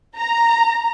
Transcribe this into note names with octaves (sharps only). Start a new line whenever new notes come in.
A#5